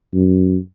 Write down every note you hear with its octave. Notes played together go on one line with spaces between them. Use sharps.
F#2